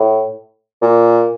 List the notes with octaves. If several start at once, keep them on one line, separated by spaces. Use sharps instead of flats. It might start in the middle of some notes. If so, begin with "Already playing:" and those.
Already playing: A2
A#2